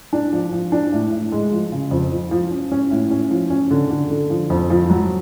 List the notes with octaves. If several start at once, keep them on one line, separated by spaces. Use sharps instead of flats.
D4
F3
F3
D4
A2
A2
G#3
F3
C#3
F2
F3
F3
C#4
C#4
A2
C#4
F3
C#4
D3
D3
D3
F3
F2
F3
F#3